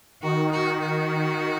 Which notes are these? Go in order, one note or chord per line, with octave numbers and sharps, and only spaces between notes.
D#3 F#4
F#4
F#4